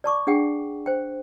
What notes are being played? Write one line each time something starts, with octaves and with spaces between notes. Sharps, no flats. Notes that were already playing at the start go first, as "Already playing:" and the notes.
D5 A5 C#6 D6
D4 G#4 F#5 G5
C5 G5